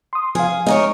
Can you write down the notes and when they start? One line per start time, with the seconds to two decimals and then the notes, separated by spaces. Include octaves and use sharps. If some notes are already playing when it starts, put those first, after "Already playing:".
0.13 C6 D#6
0.35 F3 G#4 F5
0.66 G#3 D#4 A#4 C#5